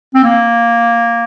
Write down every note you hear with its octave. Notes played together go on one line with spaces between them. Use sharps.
C4
A#3